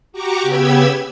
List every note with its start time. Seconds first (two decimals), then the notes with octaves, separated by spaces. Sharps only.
0.12 F#4 G4 A#5 C#6 D6
0.43 C#3 B3 G4 B5 E6 G#6